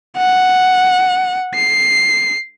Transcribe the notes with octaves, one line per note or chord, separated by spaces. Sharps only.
F#5
C7